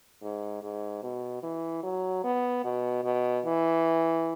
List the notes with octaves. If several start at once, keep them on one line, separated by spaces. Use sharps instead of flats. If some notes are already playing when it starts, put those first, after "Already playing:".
G#2
G#2
B2
E3
F#3
B3
B2
B2
E3